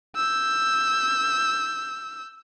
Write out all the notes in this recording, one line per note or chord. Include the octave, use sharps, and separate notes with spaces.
E6 G6